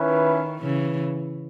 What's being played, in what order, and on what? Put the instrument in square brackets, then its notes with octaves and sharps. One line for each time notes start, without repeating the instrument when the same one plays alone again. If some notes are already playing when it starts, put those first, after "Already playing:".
Already playing: [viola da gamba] D#3 [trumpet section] C#4 E4 B4
[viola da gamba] C#3 E3